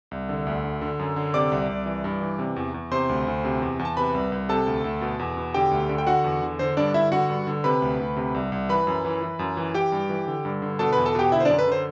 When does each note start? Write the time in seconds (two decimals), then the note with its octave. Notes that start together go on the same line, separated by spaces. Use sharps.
0.11 C2
0.29 D3
0.47 D2
0.64 D3
0.81 D3
0.99 F#2
1.16 D3
1.34 C3 D5 D6
1.52 C2
1.69 C2
1.86 E3
2.04 G2
2.21 E3
2.39 C3
2.56 E2
2.74 E2
2.91 C3 C5 C6
3.09 D2
3.27 D2
3.44 C3
3.62 E2
3.79 E2
3.85 A5
3.97 C3 B4 B5
4.14 C2
4.32 C2
4.49 C3 A4 A5
4.67 D2
4.84 D2
5.01 B2
5.19 E2
5.37 B2
5.54 D3 G4 G5
5.71 D2
5.89 D3
5.98 G5
6.07 D3 F#4 F#5
6.24 E2
6.42 D3
6.59 D3 C5
6.77 G2 D4 D5
6.94 D3 E4 E5
7.12 D3 F#4 F#5
7.30 G2
7.47 D3
7.64 C3 B4 B5
7.82 D2
7.99 D2
8.16 C3
8.35 C2
8.52 C2
8.69 E3 B4 B5
8.87 F#2
9.05 E3
9.22 E3
9.39 F#2
9.57 E3
9.74 E3 G4 G5
9.92 G2
10.10 E3
10.27 D3
10.45 G2
10.62 D3
10.79 B2 A4 A5
10.93 E2 B4 B5
11.06 A4 A5
11.15 B2 G4 G5
11.32 D3 E4 E5
11.40 C5
11.45 D4 D5
11.50 F#2
11.59 B4
11.67 D3 C5